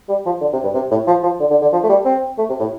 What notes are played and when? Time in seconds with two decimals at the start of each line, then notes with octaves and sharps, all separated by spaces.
0.09 G3
0.26 F3
0.41 D3
0.53 C3
0.63 G2
0.74 C3
0.91 A2
1.07 F3
1.23 F3
1.40 D3
1.50 D3
1.62 D3
1.73 F3
1.83 A3
1.89 G3
2.05 C4
2.38 A3
2.49 C3
2.60 A2